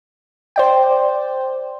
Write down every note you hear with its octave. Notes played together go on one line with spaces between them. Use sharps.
C5 D5 G5